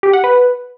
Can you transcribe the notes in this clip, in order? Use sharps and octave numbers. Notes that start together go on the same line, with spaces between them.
G4
F#5
B4